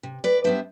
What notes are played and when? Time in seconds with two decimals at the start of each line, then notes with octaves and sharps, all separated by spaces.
0.03 C3
0.24 B4 D5
0.44 G3 B3 D4 C5 E5